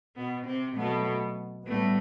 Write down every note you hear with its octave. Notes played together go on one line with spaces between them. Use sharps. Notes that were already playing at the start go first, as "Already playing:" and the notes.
B2 B3
C3 C4
B2 F#3 A3 B3
A2 G3 A3 B3